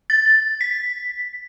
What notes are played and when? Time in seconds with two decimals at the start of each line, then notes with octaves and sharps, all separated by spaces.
0.10 A6
0.61 B6